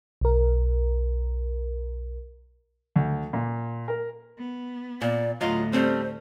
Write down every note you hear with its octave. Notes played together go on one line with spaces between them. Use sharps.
B1 A#4
D2
A#2
A#4
B3
A#2 D5
D2 A2 F#3 F4 D#5 F5
G3 A3 C4 C5